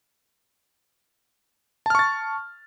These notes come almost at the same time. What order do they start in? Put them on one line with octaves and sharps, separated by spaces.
A5 F6 C#6 A6